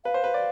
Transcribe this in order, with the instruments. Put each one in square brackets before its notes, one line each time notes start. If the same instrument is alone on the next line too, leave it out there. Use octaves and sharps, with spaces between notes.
[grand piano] B4 [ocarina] F5
[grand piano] C5
B4
D5